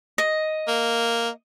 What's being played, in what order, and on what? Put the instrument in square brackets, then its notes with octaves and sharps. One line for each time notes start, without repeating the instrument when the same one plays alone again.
[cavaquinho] D#5
[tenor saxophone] A#3